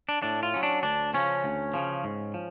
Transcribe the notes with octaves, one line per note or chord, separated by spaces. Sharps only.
D4
A2 D4
F4
F#3 C#4
D4
D2 D4
C#3 F3 C#4
D2
C#3 F3
G#2
F3